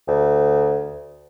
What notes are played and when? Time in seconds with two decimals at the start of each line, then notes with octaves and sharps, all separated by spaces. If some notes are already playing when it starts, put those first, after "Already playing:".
0.08 D2